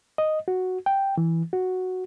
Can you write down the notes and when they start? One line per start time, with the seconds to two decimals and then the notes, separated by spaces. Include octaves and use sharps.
0.18 D#5
0.48 F#4
0.86 G5
1.18 E3
1.53 F#4